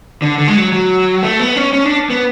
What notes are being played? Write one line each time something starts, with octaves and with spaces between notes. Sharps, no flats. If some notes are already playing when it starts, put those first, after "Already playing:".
D3
D3
G#3
F#3
F#3
A3
B3
C#4
C#4
D4
B3